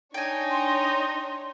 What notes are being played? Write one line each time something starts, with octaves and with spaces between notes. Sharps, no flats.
D4 D#4 C#5 G5 G#5
C6